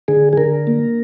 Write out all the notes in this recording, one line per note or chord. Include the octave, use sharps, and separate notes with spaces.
D3 G#4
G#4
D3 A#4
A#3